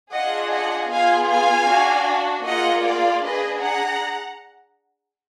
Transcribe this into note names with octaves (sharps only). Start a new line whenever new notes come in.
D4 F4 G#4 D#5 F#5
D#5 F#5
B3 F4 G#4 F5 G#5
F5 G#5
D4 F#4
A#3 F4 G#4 D#5 F#5
D5 F5
D4 G#4 B4 D#5
F#5 A#5